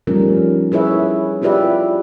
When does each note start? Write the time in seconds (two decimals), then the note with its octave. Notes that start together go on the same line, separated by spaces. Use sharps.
0.07 F3 G3 A3 C#4 D#4 A#4
0.72 E4 G#4 B4 C#5 E5
1.42 E4 F4 G4 B4 D5 E5